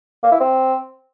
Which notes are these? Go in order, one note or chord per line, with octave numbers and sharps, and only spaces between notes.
A#3
E4
C4